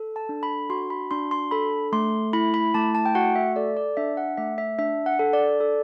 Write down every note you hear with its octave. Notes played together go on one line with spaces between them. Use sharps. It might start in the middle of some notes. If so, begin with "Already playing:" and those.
Already playing: A4
A5
D4
B5
F#4 C6
B5
D4 C6
C6
A4 B5
A3 C6
E4 B5
B5
A3 A5
A5
G5
F#4 F#5
E5
A4 D5
D5
D4 E5
F#5
A3 E5
E5
D4 E5
F#5
A4
D5
A4